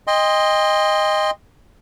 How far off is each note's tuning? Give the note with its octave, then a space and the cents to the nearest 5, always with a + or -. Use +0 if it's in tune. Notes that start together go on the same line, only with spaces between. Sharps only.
D#5 +0 G5 +40 C6 +0